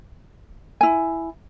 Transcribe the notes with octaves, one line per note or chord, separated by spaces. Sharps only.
E4 G#5